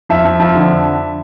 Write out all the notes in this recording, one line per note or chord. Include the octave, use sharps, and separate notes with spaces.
F2 E5
F2
F2
D3